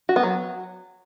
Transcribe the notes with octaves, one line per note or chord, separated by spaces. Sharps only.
F#4
B3
F#3